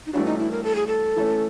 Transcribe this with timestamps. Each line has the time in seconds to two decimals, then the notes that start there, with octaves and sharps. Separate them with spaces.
0.06 D#4
0.13 G2 E3 A3 C#4 D4 F#4
0.26 D#4
0.39 E4
0.51 A#4
0.64 A4
0.75 G#4
0.87 A4
1.16 E3 A3 C#4